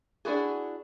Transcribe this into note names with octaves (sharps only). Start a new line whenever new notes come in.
D4 E4 F#4 G#4